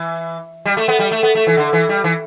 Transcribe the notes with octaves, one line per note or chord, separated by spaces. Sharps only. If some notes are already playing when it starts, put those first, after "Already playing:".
Already playing: E3
G3
A3
B3
G3
A3
B3
A3
E3
D3
E3
G3
E3